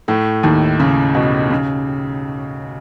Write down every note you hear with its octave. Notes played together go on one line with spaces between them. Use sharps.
A2 A3
D#2 D#3
C#3
B2
C#3